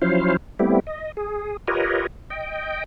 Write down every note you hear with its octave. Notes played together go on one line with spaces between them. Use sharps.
F3 F#3 C#4 E4 C5 F5
G3 A3 B3 C4 E4 G4
D#5
G#4
F4 G4 A#4 B4 C#5 D#5
D#5 G5